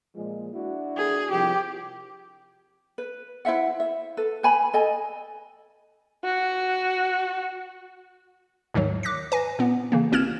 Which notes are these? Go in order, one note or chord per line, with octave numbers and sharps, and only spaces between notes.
A#2 F3 G#3
D4 E4 F#4
G#4
C2 F3 G4
B4
E4 C5 E5 F#5
E5
A4 B4
B4 G#5 B5
A4 D#5 G#5
F#4
D#2 G#2 D#3 F#3
D6 F#6 A#6 B6
B4 G#5 A#6
A#2 B3
C#3 E3 A#3
G#1 C4 E4 F6 G#6 E7